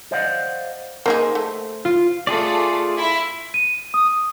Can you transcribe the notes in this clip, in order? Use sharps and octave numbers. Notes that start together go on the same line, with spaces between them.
C5 D5 D#5 F5 F#5
A#3 D#4 G#4 C5
A3
F4
A3 F4 G#4 D5
E4 E5
D#7
D#6